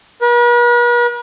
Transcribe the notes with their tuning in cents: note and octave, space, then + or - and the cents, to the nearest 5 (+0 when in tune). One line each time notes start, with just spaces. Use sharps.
B4 -45